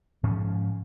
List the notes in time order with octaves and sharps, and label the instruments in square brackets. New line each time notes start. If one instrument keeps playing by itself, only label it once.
[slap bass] G#2 F3 C#4